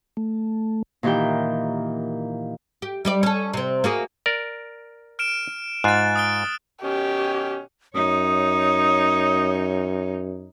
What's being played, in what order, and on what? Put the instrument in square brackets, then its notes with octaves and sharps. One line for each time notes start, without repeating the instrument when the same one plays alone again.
[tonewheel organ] A3
[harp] A#2 D#3 E3 G4 G5
[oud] G4
G3 G4 D5
C#4 A4
C3 C4
A#3 F#4 G#4
[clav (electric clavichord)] A#4 D5
[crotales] F6 D7 E7
[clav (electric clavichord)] G#2 F4 [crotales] F#6 A6
[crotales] D#6 D7 G7
[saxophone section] B2 D#3 C#4 [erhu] G4
[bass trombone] F#2 [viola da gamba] D#4 C#5 [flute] D#6